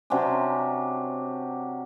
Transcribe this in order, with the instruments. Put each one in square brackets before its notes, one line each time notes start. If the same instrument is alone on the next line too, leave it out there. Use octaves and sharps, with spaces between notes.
[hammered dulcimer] C3 F#3 C#4 D4